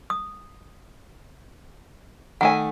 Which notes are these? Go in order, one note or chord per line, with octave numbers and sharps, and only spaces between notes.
D#6
D#3 A3 F#5 G#5